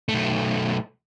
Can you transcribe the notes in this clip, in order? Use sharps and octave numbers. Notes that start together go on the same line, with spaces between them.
B1 A3